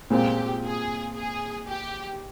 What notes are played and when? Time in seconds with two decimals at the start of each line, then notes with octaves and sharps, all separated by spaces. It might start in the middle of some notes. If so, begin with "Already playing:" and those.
0.10 A#2 G#3 C4 F4 G4
0.63 G#4
1.15 G#4
1.67 G4